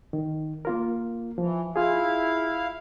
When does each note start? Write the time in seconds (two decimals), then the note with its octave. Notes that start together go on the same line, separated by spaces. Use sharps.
0.13 D#3
0.65 A#3 F4 A#4
1.38 E3 F3
1.76 E4 F4 G#4 F5